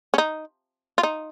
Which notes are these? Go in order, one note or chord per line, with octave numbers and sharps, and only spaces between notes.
C#4
D#4
F4
D#4